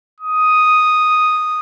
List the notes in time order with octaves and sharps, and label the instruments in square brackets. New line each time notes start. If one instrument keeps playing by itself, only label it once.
[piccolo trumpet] D#6